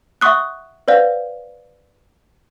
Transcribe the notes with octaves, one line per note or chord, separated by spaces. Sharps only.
E5 F#5 C6 C#6 D#6 F#6
B4 C5 D5 F5 F#5